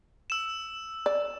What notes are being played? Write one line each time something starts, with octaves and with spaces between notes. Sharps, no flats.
E6 E7
D5